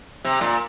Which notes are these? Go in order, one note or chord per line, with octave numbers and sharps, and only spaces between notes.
C3
A#2